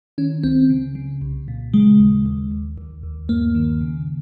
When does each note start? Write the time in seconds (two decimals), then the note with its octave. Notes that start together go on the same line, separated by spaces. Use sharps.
0.18 D#3 C#4
0.43 C#2 C4
0.70 C#3
0.95 C#3
1.21 C2
1.48 A#2
1.73 C#3 G#3
2.00 D#2
2.26 D#2
2.51 D#2
2.78 D#2
3.03 D#2
3.29 G2 A#3
3.55 D#3
3.81 C#3